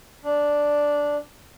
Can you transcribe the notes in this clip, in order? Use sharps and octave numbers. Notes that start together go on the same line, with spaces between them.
D4